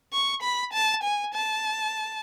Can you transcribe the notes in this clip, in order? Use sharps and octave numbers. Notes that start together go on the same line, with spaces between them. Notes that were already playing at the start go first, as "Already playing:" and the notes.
C#6
B5
A5
G#5
A5